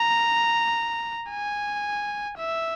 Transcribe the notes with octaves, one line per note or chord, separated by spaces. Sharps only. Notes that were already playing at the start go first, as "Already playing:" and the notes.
Already playing: A#5
G#5
E5